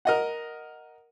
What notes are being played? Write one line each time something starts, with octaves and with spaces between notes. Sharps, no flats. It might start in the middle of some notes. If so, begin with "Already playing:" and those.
A#4 D#5 F#5